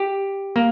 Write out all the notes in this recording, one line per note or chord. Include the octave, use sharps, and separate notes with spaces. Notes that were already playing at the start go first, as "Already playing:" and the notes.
Already playing: G4
A#3